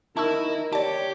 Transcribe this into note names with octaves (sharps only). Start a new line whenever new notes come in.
D#4 E4 A#4 A5 C#6 E6
G4 C#5 D5 A5